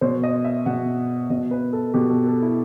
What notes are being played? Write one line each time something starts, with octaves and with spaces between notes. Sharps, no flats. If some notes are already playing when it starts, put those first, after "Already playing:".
B2 C5
D#5
E5
B2 F#5
B2 D#5
B4
A4
B2 G4
A4
A4
E4